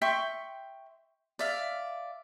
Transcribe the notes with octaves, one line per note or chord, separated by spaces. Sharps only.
E5 G5 C6 C#6
D5 E5 F5